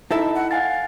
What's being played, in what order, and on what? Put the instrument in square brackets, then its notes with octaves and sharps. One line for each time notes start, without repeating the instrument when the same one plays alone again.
[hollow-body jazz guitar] D#4 E4 A4 [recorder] E5
[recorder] F#5
[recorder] F5 [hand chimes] F#5 G#5 A6